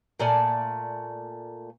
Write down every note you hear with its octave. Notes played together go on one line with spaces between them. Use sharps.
A#2 A3 D5 G#5